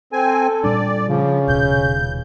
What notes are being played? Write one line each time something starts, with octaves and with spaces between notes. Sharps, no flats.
C4 A4 G#5
A#2 G3 D4 D5
C#3 F3 C#4
D#1 B2 G6